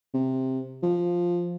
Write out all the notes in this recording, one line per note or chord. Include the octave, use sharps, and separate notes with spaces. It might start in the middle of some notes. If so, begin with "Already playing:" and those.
C3
F3